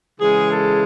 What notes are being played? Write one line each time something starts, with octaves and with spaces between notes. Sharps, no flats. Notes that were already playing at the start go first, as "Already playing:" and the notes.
C#3 E3 G#3 G#4
A4